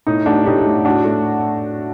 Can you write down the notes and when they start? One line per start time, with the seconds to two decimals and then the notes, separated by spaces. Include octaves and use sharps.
0.07 A2 D#4
0.26 A3 D4 F#4
0.46 A2 D#4 G4
0.66 A3
0.85 A2 D4 F#4
1.04 A3